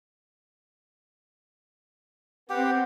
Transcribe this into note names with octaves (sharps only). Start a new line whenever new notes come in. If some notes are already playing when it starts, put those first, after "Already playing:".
B3 C4 G4 F#5